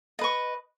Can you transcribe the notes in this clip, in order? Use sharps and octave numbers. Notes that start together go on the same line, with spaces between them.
B4 D#5 C#6